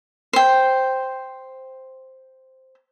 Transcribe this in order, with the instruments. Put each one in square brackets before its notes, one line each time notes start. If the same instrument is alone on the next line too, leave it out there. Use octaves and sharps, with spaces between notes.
[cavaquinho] C5 G5